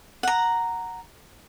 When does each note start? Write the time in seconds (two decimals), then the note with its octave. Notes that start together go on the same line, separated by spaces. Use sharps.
0.23 F#5 A#5